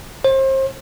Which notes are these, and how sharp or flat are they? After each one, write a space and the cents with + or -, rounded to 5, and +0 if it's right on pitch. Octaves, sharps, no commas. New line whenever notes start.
C5 +35